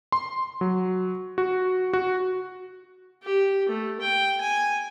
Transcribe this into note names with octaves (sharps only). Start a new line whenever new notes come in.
C6
F#3
F#4
F#4
G4
A3
G5
G#5